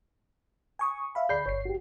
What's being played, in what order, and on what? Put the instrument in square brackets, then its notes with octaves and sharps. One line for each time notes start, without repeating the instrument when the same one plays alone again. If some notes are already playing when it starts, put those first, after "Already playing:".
[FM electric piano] G#5 C#6 D#6
E5 F5 B5
[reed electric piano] D2 B5 G6 [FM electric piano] G#4 D5 C7
[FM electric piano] G1 C7 [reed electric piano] C#5
[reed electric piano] F#4 G4